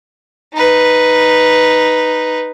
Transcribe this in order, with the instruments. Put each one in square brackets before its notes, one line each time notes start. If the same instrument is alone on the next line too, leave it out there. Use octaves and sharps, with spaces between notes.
[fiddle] D#4 B4